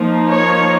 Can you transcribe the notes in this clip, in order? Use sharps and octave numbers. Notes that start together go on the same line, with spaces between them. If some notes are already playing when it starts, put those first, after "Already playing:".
Already playing: F3 A#3 D#4
C#5